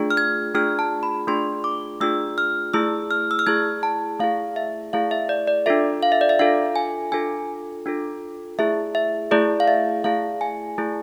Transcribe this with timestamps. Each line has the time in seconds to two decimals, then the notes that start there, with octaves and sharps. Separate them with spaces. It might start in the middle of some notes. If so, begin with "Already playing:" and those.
Already playing: A3 D4 F4 G#4
0.10 F6
0.17 G#6
0.54 A3 D4 F4 G#4 F6
0.79 A5
1.03 B5
1.27 A3 D4 F4 G#4 C6
1.64 D6
2.01 A3 D4 F4 G#4 E6
2.38 F6
2.74 A3 E4 G#4 E6
3.11 F6
3.31 E6
3.39 F6
3.47 A3 E4 G#4 G#6
3.83 A5
4.20 A3 E4 G#4 F5
4.56 E5
4.93 A3 E4 G#4 F5
5.11 E5
5.29 D5
5.47 D5
5.66 D4 F4 A4 E5
6.03 F5
6.12 E5
6.21 D5
6.29 E5
6.39 D4 F4 A4 F5
6.76 G#5
7.12 D4 F4 A4 G#5
7.86 D4 F4 A4
8.59 A3 E4 G#4 E5
8.95 E5
9.31 A3 E4 G#4 D5
9.60 F5
9.68 E5
10.04 A3 E4 G#4 F5
10.41 G#5
10.78 A3 E4 G#4